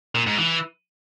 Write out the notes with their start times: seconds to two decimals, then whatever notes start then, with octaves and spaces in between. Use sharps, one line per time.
0.15 A#2
0.27 G#2
0.38 E3